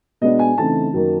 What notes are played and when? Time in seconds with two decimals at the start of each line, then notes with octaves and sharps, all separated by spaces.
0.21 B2 G#3 B3 D4 D#5
0.39 G#5
0.58 C#3 E3 A3 C4 D#4 A5
0.93 F#2 D#3 F#3 A#3